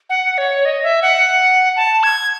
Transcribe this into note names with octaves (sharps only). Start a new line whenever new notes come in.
F#5
C#5
D#5
E5
F#5
A5
G#6